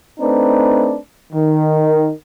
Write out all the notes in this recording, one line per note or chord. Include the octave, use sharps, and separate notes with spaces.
A3 C4 D4 D#4 B4
D#3